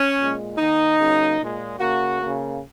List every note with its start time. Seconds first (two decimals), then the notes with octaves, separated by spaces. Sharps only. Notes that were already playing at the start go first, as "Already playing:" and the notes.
Already playing: C#4
0.18 A#2 G#3
0.57 D#3 A#3 D#4
0.99 C#3 F#3 A#3
1.39 A#2 G#3
1.78 C#3 A#3 F#4
2.19 C#3 A#3